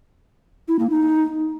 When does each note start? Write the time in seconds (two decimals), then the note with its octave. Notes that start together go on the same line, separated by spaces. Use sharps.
0.68 E4
0.79 A#3
0.90 D#4